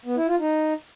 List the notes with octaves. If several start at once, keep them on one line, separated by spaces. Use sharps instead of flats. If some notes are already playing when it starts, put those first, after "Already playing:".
B3
E4
F4
D#4